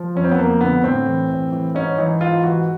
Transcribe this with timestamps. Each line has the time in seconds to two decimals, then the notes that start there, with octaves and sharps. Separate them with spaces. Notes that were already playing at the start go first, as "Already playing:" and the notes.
Already playing: F3
0.15 F2 C#4
0.24 C4
0.31 B3
0.38 F2 A#3
0.61 D3 B3
0.84 A2 C4
1.06 E3
1.30 A2
1.52 E3
1.75 G#2 C#4
1.98 E3 D#4
2.21 G#2 F4
2.43 E3 F#4